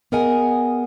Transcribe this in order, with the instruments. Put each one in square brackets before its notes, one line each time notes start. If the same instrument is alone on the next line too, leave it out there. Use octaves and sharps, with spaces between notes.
[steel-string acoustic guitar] B3 G#4 A#4 D#5 F#5 G#5